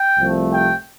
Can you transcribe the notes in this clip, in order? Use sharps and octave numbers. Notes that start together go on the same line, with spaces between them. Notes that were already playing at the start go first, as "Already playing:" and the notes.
Already playing: G5
C2 C3 F3 A3
G5